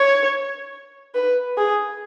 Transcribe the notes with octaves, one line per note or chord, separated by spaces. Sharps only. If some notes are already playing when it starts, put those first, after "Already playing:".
Already playing: C#5
B4
G#4